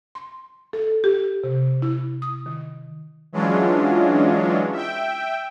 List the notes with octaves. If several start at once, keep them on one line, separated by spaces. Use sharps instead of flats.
C6
A4
G4
C3
E4
D#6
D#3
E3 F#3 G#3 C#4 D4 F4
E5 G5